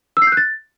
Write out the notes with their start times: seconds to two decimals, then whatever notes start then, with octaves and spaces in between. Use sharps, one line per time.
0.17 E6
0.22 C7
0.27 G6
0.32 F#6
0.37 A6